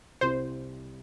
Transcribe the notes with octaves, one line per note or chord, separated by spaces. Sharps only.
C2 C3 G3 C4 E4 C5